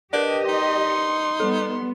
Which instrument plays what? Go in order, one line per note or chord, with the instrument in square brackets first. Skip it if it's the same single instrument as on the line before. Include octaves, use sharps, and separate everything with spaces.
[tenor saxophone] D4 [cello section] G4 D#5 [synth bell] A#4 B4 D5
[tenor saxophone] D#4 [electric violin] C6
[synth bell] C#7
[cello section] G3 B3 [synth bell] A4